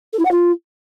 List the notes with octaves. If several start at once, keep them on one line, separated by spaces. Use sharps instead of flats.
A4
E4
F#5
F4